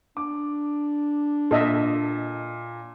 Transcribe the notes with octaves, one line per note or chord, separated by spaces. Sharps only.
D4 D6
A#2 A4 D#5 E5